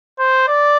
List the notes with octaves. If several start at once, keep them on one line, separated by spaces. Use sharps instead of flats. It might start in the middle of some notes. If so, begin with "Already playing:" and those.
C5
D5